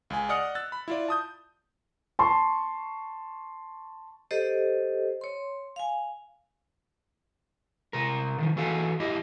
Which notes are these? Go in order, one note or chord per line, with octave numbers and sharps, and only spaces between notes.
C#2 C#3 G#5
D5 D#5 F#5 D#6 F6 C#7
E6 F#6 A6
B5
E4 F4 D5
A5 D#6 G6
A5 C6 C#6
G4 A4 C5 D#5
C#5 C6
F5 G#5
C3 A#4
C3 D#3 F3
E3 F#4 A4 F5 G#5
F2 E4 G4 D#5